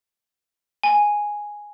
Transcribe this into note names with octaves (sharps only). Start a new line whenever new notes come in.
G#5